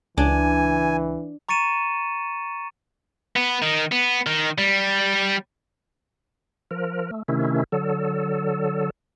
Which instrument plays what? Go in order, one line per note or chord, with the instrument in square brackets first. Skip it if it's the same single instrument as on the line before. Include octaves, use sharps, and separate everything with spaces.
[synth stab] C#2 [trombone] E3 [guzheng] D4 [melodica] G#5
[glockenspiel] A#5 C#6 A6 C#7 D#7 E7
[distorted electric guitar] B3
D#3
B3
D#3
G3
[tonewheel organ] F3 A#4
A3
C3 D#3 A3 C#4 E4
D3 F#3 A4